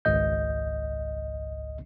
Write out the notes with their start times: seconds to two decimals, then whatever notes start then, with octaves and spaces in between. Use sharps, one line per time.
0.05 G#1 C#2 D#5 G6